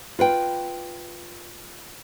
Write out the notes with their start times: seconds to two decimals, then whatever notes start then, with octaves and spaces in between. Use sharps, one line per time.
0.19 F4 B4 G5